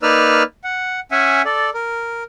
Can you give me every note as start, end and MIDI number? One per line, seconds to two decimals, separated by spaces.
0.03 0.43 58
0.03 0.43 63
0.03 0.43 71
0.03 0.43 74
0.03 0.43 88
0.03 0.43 89
0.64 1.00 78
1.11 1.42 61
1.11 1.42 76
1.11 1.42 78
1.11 1.42 80
1.45 1.70 69
1.45 1.70 74
1.74 2.23 70